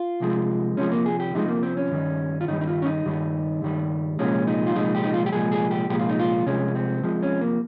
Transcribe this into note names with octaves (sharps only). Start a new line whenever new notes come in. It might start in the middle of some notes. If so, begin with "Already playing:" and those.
Already playing: F4
C2 C3 F3 G#3
C2 C3 F3 G#3 C#4
A#3
G#4
G4
C2 C3 F3 G#3 D#4
A#3
C4
C#4
G2 D#3 G3
F4
G2 D#3 G3 D#4
D#4
F4
C#4
D#4
G2 D#3 G3
G2 D#3 G3
C2 A#2 F3 G#3 C#4
D#4
F4
C2 A#2 F3 G#3 D#4
G4
D#4
F4
G4
C2 A#2 F3 G#3 G#4
G#4
G4
C2 A#2 F3 G#3 G4
F4
D#4
F4
C2 C3 F3 G#3 C#4
C4
C2 C3 F3 G#3
C#4
A#3